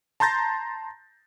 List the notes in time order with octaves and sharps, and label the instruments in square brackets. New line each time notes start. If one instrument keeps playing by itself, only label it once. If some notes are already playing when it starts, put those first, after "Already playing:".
[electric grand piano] A5 A#5 C6 G6 A6 A#6